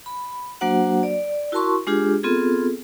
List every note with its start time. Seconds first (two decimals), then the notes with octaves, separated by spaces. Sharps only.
0.06 B5
0.61 F#3 A#3 D4 F#4 C5 F#5
1.03 D5
1.52 E4 F#4 A#4 A5 C6 C#6
1.87 G#3 D4 F4 G4 G#4
2.23 B3 C4 F4 G#4 A4